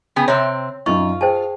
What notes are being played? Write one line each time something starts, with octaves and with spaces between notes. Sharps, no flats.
C#3 B3 G#4 G5
C3 C4 C#5
F#2 D#4 F4 C#6
G#4 C5 G5 A5